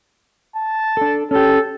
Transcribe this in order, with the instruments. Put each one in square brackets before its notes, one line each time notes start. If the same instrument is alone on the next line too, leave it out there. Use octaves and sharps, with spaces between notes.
[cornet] A5
[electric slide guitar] D4 A4
[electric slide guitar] C#4 G4 [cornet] A4